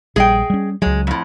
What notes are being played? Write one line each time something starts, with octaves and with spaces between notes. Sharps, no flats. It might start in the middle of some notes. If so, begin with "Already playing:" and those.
A#1 G3 G#4 D#5 G5
G3 C#4
C#2 F#3 G#3
F2 A2